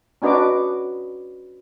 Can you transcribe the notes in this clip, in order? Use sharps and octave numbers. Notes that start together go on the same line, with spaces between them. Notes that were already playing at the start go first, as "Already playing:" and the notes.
C#4 D4 F#4 B4 D#5 D6